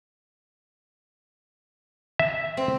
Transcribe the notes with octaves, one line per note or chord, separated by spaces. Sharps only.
E5
C4